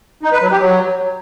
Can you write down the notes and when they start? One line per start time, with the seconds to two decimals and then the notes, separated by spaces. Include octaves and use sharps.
0.23 D#4
0.32 B4
0.42 F#3
0.51 G4
0.61 F#3